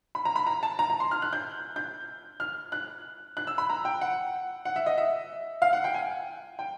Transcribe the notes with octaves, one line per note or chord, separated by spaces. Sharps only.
B5
A#5
B5
A#5
A5
A#5
A#5
C6
F6
F#6
G6
G6
F6
F#6
F#6
E6
B5
A#5
G5
F#5
F#5
E5
D#5
E5
F5
F#5
G5
G#5
G5